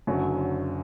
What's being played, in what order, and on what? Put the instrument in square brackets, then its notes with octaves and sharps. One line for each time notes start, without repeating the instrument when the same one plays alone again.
[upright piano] F#1 F#2 D3 F#3